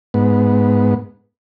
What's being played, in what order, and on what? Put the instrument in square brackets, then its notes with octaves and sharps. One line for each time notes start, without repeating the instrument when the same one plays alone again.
[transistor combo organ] G#2 B3